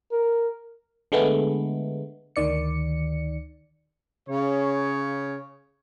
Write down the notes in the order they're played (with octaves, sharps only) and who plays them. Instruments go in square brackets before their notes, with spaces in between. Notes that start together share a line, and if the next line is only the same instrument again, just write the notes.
[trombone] A#4
[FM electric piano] D3 G#3 A3 B3
D2 D#3 D5 C#7
[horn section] C#3 C#5